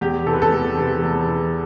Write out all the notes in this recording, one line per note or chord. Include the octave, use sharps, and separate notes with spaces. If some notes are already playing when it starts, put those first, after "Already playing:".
E2 G4
C3 E3 A4
B4
A4
E2
C3 E3
E2
C3 E3